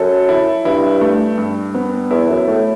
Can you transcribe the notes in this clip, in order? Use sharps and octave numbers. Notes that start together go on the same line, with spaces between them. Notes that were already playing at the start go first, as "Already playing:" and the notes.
Already playing: F#2 A4
E4
G2 E4
A3
G2
B3
E2 E4
F#2
A2 A3